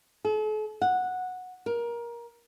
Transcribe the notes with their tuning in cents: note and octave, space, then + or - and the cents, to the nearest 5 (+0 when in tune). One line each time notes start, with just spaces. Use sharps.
A4 -45
F#5 -10
A#4 +20